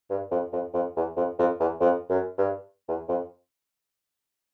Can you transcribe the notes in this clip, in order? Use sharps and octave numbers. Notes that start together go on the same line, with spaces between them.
G2
F2
F2
F2
E2
F2
F2
E2
F2
F#2
G2
E2
F2